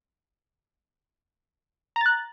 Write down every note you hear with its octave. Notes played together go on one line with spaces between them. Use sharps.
A#5 F#6 A6